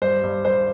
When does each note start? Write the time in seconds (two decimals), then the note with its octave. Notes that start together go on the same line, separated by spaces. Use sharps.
0.02 G2 C5
0.23 G2
0.45 G2 C5